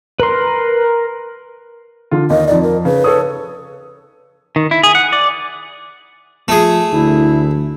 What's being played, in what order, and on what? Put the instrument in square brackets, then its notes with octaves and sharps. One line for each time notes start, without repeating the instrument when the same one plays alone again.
[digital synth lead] A#4 [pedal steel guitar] B4 C6
[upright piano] D3 F4
[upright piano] D#2 [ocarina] D#5
[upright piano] F2 D#4 [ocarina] D5
[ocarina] A#4
[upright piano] C#3 [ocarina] B4
[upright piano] A4 C#5 D#6
[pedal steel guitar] D#3
E4
G#4
F#5
D5
[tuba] F3 [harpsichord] A3 G#4
[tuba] D2 [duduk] E4